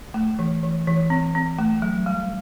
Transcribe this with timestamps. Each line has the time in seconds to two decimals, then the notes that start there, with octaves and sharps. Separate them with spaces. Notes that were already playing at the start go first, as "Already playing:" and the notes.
0.14 A3
0.39 E3
0.63 E3
0.87 E3
1.10 C4
1.35 C4
1.59 A3
1.82 F#3
2.06 G3